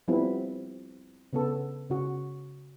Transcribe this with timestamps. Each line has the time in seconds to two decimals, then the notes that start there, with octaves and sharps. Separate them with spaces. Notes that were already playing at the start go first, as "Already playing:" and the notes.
0.08 F3 G3 B3 C4 E4
1.33 C#3 B3 A4
1.90 C#3 F#4